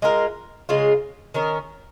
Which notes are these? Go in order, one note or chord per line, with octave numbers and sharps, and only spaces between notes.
G#3 F4 A#4
C#3 G#3 F4
D#3 C#4 A#4